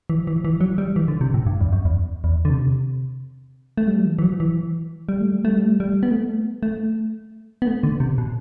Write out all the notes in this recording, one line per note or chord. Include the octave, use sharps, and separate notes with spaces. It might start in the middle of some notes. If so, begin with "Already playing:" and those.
E3
E3
E3
F#3
G3
E3
D3
C3
A2
G2
E2
F#2
E2
E2
D3
C3
A3
G3
F#3
E3
E3
F#3
E3
G3
A3
G3
A3
G3
A3
G3
B3
A3
A3
B3
A3
D3
C3
B2